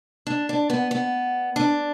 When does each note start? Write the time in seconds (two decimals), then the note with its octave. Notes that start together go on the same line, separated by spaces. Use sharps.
0.27 D4
0.49 D4
0.70 B3
0.91 B3
1.56 D4